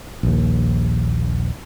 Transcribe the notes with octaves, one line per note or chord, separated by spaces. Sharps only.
A#1 D#2